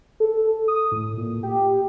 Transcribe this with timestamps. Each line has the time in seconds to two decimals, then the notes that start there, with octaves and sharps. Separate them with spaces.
0.20 A4
0.68 D#6
0.92 A2
1.17 A#2
1.43 G4